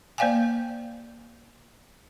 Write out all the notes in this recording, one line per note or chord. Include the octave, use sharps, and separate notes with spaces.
A#3 C5 D5 F5 G5 G#5